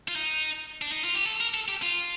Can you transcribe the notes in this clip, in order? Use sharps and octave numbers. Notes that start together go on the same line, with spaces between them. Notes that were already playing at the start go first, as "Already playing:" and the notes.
F4
D#4
D4
D#4
F4
G4
A4
A#4
A4
G4
F4